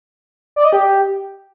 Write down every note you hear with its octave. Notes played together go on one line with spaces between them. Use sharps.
D5
D#5
G4